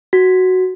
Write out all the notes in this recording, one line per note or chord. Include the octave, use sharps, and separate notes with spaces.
F#4